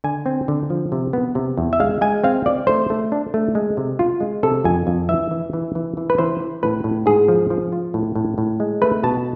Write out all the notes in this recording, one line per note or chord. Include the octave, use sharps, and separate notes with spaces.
D3 G#5
C4
D3
F3
C3
B3
C3
E2
E5
G#3 F5
G#3 G#5
C4 F5
C4 D5
A3 C5
A3
D4
A3
G#3
C3
F4
G#3
C3 A4
F2 G#5
F2
E3 E5
E3
E3
E3
E3
B4
E3 C5
E3
A2 B4
A2
G#2 G#4
F3
F3
F4
A2
A2
A2
G#3
A3 B4
B2 A5